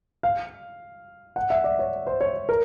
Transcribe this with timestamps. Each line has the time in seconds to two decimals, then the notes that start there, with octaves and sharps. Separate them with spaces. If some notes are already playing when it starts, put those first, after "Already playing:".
0.23 F5
1.36 F#5
1.50 E5
1.64 D5
1.79 C#5
2.07 C5
2.21 C#5
2.49 A#4